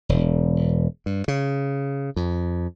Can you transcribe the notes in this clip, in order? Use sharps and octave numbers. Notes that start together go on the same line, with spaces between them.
E1
G2
C#3
F2